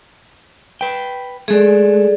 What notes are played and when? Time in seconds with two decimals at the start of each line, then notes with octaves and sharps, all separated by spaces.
0.81 B4 G5
1.48 G#3 A3 G#4 A4 D5